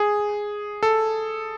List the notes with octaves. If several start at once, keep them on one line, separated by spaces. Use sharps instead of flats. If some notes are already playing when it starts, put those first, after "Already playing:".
Already playing: G#4
A4